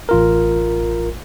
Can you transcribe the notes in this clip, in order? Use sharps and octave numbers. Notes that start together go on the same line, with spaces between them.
A1 F4 A#4